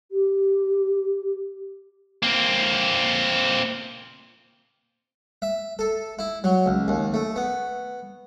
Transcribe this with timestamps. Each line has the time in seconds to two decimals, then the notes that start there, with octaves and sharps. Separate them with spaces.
0.12 G4
2.23 A#3 C4
5.42 E5
5.79 A4
6.19 E4
6.44 F#3
6.66 C#2
6.88 D#2
7.14 A3
7.36 B3